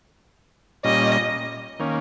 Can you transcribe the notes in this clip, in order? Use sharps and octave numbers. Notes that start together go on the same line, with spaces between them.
A#2 G3 C#4 D#5
D#3 A#3 C#4